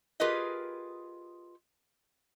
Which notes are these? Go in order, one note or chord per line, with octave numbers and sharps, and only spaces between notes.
F4 G4 G#4 A#4 B4 D#5